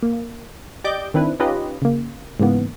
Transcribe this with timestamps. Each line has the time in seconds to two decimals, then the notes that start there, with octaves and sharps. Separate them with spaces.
0.03 A#3
0.84 G4 D5 D#5 D6 G6
1.14 D#3 C4 D4 E4 B4
1.40 C#4 D#4 F4 G4 B4 D#5
1.82 C#3 A#3
2.40 G#2 C#3 E3 A#3 B3